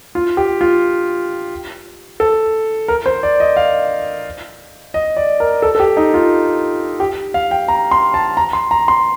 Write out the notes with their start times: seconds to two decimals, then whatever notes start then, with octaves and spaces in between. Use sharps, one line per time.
0.15 F4
0.37 G4
0.61 F4
2.20 A4
2.88 A#4
3.06 C5
3.23 D5
3.40 D#5
3.57 F5
4.94 D#5
5.16 D5
5.40 A#4
5.62 A4
5.75 A4
5.80 G4
5.97 D#4
6.14 F4
7.00 G4
7.34 F5
7.51 G5
7.68 A#5
7.91 C6
8.14 A5
8.37 A#5
8.53 C6
8.71 A#5
8.88 C6